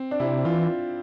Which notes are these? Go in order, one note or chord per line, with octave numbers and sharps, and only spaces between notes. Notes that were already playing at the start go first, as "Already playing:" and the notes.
Already playing: C4
D4
C3 E4
E3 F4